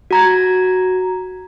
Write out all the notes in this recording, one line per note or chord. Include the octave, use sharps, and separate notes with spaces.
F#4 A#5 G#6